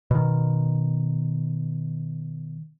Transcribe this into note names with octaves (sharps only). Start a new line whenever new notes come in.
B2 D#3